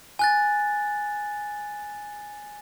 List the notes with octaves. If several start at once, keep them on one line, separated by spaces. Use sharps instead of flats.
G#5 F#6 A6